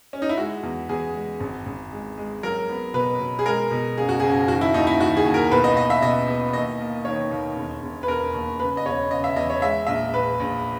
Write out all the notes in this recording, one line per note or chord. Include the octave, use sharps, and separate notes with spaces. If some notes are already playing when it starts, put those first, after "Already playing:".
C#4
D#4
E4
G#3 F#4
E2
E2 G#4
G#3
G#1
G#1
G#3
G#3
F#3 A#4
B3
B2 B4
B2
G#4
G#3 A#4
B2
F#1 G#4
F#4
F#1 G#4
D#3 F#4
E4
D#2 D#4
E4
D#3 F#4
G#4
D#2
A#4
B1 B4
D#5
B1 D#5
E5
B2 D#5
B3
D#2 D#5
A#3
D#3 C#5
D#2
E1
E1
B4
E1 A#4
D#2
C#3 B4
D#5
E1 C#5
C#3 D#5
E5
E2 D#5
C#5
G#3 E5
A#1 E5
A#1 B4
A#1